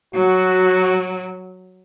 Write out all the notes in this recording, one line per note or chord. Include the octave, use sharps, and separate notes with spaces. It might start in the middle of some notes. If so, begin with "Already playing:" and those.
F#3 F#4